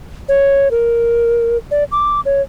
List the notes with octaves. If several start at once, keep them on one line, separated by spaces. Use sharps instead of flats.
C#5
A#4
D5
D6
C#5